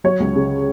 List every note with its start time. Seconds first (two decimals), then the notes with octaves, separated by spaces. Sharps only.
0.04 F#3 C#5
0.20 C#2
0.36 C#3